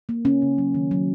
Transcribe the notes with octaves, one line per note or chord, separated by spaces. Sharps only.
A#3
C#3 C#4
C#3
F#3
D#3
F#3